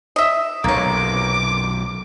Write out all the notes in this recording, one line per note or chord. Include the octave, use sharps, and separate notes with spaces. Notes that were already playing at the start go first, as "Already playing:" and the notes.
D#5 E5
B1 F#2 C3 A#3 C#5 D6